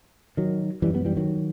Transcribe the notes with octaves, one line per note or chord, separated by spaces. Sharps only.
D#3 F#3
F#2 E3 G3
G3 B3
E3 G3
D#3 F#3